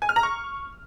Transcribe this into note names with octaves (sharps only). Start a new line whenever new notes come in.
G#5
F6
A#5
C#6